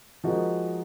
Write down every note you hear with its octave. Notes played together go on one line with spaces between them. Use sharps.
F3 G#3 D#4 F#4 A#4